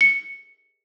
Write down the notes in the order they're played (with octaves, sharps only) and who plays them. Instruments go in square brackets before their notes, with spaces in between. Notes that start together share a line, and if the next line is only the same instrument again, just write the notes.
[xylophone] C#7